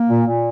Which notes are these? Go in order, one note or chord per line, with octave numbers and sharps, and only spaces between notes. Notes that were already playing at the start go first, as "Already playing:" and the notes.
Already playing: A#3
A#2
A#2